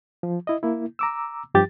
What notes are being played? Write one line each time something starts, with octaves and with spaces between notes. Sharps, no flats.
F3
E4 D#5
A#3 E4
A#5 D6 E6
G2 F3 G4 A6